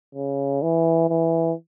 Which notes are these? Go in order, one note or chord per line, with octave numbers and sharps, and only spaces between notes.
C#3
E3
E3